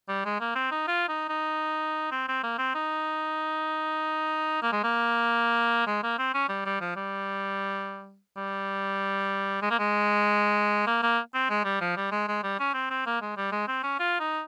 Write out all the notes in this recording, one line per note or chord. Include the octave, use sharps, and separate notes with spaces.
G3
G#3
A#3
C4
D#4
F4
D#4
D#4
C4
C4
A#3
C4
D#4
A#3
G#3
A#3
G#3
A#3
C4
C#4
G3
G3
F3
G3
G3
G#3
A#3
G#3
A#3
A#3
C4
G#3
G3
F3
G3
G#3
G#3
G3
C#4
C4
C4
A#3
G#3
G3
G#3
C4
C#4
F4
D#4